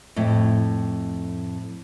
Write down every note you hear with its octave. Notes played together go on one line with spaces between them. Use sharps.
F2 A2